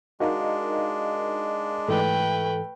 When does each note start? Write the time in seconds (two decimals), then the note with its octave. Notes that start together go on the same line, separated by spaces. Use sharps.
0.20 G#3 D4 D#4 F#4 A#4 F5
1.88 G#2 E3 A3 B4 G5